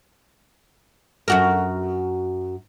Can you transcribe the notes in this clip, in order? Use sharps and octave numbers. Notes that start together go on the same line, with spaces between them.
F#2 F#4 A#4